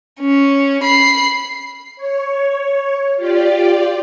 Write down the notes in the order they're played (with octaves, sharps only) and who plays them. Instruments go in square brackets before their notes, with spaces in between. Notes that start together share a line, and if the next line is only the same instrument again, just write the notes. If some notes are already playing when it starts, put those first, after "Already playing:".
[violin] C#4
B5 C7
[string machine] C#5
F4 G4 D5